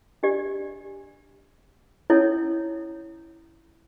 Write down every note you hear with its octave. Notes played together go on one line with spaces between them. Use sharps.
D4 G4 D5
C#4 E4 A4 C#5